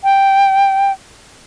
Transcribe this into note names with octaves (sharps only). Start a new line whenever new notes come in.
G5